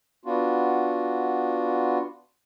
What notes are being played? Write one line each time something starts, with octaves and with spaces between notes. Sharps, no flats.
B3 D4 F4 F#4